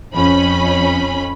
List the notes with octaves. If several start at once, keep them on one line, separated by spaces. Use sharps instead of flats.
F2 C#4 B5